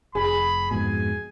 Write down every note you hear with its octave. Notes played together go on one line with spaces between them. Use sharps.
F1 G#4 B5
F2 G#2 B2 G#5